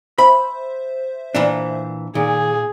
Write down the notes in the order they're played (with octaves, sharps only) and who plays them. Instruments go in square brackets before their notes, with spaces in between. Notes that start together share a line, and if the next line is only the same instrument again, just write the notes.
[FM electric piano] C5 E5 [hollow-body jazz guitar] B5
[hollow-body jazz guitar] A#2 E3 D4
[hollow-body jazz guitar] A#2 [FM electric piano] D#3 [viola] G#4